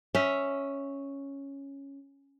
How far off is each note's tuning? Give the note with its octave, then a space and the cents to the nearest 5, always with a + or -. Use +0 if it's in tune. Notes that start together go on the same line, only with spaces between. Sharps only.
C#4 +0 E5 -5